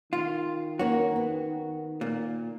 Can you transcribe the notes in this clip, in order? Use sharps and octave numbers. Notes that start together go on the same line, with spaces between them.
D#3 F4
A#3 C#4 F#4 C#5
B3
A#2